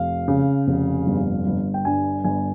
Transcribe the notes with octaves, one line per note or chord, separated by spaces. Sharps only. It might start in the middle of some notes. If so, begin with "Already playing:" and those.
Already playing: F1 F5
C#3
F1
G1
G1
G5
G2 G#5
G1 G#5